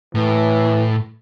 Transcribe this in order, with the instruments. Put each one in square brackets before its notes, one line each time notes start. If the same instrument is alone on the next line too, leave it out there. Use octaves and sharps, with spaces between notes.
[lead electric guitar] A2 [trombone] E3